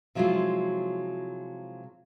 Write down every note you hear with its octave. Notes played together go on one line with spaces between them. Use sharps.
C3 F3 F#3 G#3 E4 F4